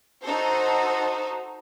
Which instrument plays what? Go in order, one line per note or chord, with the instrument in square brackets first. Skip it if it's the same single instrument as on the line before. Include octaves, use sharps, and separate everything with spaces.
[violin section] D#4 F#4 A4 C5